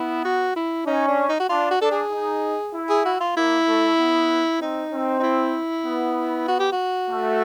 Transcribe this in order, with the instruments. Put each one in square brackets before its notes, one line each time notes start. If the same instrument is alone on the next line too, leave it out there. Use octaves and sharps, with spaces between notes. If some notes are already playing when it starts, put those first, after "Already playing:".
Already playing: [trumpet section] B3 [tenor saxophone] E4
[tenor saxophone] F#4
E4
[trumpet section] C#4 [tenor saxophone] D#4
[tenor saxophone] D4
D#4
F#4
[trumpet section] D4 [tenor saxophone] F4
[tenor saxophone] F#4
[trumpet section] D4 [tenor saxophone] A4
[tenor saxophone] G#4
[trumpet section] D#4
E4
[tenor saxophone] G#4
F#4
F4
[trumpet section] A#3 [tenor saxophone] E4
[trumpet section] A3
B3
[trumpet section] C4 [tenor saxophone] D#4
[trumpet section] C4
[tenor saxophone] D#4
E4
[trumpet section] B3
[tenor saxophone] F#4
G4
F#4
[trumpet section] A3